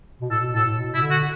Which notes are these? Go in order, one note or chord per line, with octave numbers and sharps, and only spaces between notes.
B2
A2 A4
B2
A2 A4
A2
B2
B2 E4
D3
F#4